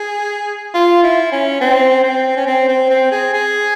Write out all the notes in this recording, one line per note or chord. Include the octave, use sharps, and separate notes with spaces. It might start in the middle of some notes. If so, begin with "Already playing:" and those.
Already playing: G#4
F4
E4
C#4
C4
C4
C#4
C4
C4
C4
G#4
G#4